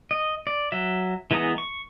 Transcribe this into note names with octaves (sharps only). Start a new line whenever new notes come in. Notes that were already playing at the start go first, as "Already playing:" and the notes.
D#5
D5
F#3 E5
E3 G#3 B3 A#5 D#6
C#6